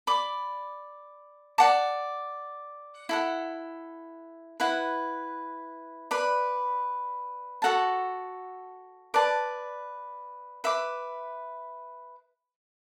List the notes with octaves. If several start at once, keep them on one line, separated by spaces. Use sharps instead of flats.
D5 B5 D6
D5 F#5 A5 D6
E4 A4 F#5
E4 B4 F#5
B4 D5 B5
F#4 A4 F#5 A5
B4 D5 A5
B4 E5 D6